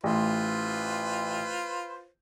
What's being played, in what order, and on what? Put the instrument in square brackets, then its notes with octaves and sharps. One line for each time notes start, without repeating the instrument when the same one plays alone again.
[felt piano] A1 [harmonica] F4 B4 C5